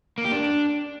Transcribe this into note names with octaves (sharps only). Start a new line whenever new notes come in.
A#3
G4
D4